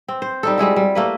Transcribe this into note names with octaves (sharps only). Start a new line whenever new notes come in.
C4
C5
G3 D#4 A4
G3 G#3 E4 F#4
G3
A3 A#3 B4